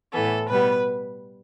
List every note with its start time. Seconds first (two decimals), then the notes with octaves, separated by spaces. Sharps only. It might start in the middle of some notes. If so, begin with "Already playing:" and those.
0.13 A2 E3 B3 A4
0.49 B2 G3 B3 B4